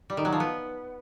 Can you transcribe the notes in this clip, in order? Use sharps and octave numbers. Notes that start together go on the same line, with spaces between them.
G3
D#3
F#3
F3
B3